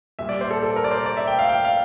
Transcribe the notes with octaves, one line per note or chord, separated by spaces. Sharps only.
A#2 G3 E5
D5
C5
A4
A4
A#4
D5
C5
D5
E5
G5
F5
G5
F5